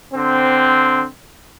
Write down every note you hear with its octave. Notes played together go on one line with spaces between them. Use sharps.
D3 C4